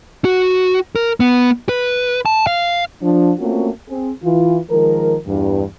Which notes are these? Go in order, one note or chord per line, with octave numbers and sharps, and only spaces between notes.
F#4
A#4
B3
B4
A5
F5
F3 D4
A3 A#3 C4 C#4 F4 F#4
C4 G#4
E3 F4
D#3 F3 G#3 A#4
E2 G2